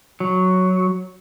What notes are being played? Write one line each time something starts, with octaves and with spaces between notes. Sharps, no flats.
F#3